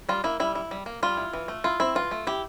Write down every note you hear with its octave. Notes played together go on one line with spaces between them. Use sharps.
G3 F4
A#3 E4
G3 E4
E4
G3
A#3
G3 F4
E4
E3
A3
E4 F4
C4 E4
E3 F4
A3
E4 G4